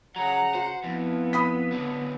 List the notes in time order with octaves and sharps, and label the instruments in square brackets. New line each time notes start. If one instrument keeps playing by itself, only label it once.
[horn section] C#3 A#5 [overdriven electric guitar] F#3 [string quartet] F#5
[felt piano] F#4 [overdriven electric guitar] C5
[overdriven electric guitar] F2 [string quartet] B3 [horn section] E4
[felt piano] B5 D#6 B6
[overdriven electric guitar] D3 F#3